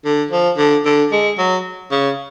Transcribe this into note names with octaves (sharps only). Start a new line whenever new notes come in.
D3
F3
D3
D3
G#3
F#3
C#3